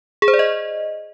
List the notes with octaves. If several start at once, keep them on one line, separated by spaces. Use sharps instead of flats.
G#4
C5
D5
D#5